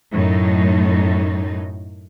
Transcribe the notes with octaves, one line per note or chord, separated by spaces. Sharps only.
F#2 A2 D#4